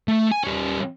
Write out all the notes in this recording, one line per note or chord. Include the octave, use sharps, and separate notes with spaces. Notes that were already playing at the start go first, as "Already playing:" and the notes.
A3
G#5
G3 C#4